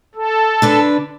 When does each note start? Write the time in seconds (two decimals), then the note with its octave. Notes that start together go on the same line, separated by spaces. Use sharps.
0.15 A4
0.62 D3 D4 B4